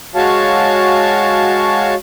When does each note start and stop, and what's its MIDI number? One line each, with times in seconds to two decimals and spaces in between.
0.15 1.95 56
0.15 1.95 66
0.15 1.95 73
0.15 1.95 77
0.15 1.95 81